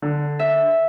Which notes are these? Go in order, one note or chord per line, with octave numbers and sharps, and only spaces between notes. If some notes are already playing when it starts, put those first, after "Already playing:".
D3
E5